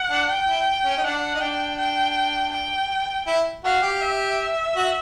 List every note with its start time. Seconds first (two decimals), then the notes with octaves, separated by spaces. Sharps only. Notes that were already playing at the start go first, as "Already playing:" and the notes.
Already playing: F#5
0.10 D4
0.29 G5
0.48 E4
0.85 C#4
0.97 D#4
1.04 D4 F#5
1.35 D#4
1.41 D4 G5
1.78 G5
2.52 G5
3.27 E4
3.65 F#4 F5
3.82 G4
4.01 E5
4.76 F#4